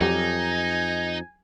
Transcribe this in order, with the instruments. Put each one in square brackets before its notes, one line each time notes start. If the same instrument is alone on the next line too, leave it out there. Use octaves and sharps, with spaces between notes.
[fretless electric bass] F2 [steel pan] F#3 G4 [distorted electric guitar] D#4 [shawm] G#5